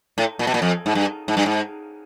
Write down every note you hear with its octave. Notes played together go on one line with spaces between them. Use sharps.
A2
A#2
B2
A#2
F2
G#2
G2
G#2
G2
G#2